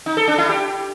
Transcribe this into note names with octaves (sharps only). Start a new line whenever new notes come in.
D#4
A4
D4
E4
G4